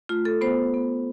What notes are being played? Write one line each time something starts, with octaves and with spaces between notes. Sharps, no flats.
A3 F4
A4
B3 C5
B3